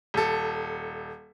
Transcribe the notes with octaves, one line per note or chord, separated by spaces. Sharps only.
D#1 A4